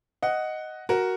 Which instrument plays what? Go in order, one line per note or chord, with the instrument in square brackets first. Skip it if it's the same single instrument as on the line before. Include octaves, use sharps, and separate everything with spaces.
[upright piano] D#5 F#5
F#4 A#4